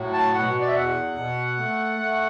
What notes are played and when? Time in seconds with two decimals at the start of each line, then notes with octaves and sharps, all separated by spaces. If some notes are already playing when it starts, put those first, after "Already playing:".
Already playing: A2 F#3
0.14 A5
0.34 B2 F#5
0.60 D5
0.67 E5
0.75 E2 F#5
1.17 B2
1.58 A3
2.00 A3